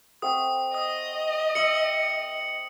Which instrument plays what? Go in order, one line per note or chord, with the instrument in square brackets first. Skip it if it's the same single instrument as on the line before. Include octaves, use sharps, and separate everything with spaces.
[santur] A3 C4 F#5 [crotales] D#6
[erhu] D#5 [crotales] D#6
[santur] E5 D#6 [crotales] C#7 F#7